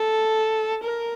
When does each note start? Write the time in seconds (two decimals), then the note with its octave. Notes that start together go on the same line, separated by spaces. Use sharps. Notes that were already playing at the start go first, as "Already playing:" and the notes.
Already playing: A4
0.84 A#4